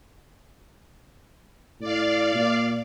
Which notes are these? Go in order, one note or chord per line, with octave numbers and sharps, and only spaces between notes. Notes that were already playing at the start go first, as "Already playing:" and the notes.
A2 D5 F5
A#2